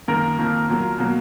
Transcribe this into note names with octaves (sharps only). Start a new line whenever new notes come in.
F#2 D#3 A#3 A#4
F2 D#3 A#3
A#2 F#3 A#3
B2 F#3 A#3